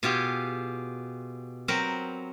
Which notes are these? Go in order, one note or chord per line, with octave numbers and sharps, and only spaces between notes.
B2 F4 G4 G#4
F#3 C4 A#4 B4